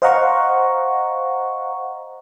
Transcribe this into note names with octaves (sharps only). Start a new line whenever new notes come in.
C5 D#5 F5 F#5 A#5 C#6